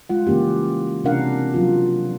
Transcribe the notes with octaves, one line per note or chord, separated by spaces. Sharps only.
G#3 F4 F#5
C#3 E3 A#3 C#4 G4
C3 C#4 D4 A#4 F5 F#5
F3 F#3 F4